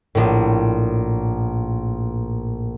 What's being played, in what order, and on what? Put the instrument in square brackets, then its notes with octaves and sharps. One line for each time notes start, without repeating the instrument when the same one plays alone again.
[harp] A#1 A2